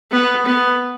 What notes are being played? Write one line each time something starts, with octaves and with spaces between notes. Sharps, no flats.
B3
B3